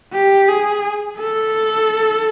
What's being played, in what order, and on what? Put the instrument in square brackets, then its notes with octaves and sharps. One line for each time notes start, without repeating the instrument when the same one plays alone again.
[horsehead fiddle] G4
G#4
A4